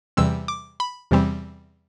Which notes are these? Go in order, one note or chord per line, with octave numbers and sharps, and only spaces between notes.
E2 C3 E3 G3 C4 E6
D6
B5
E2 C3 E3 G3 C4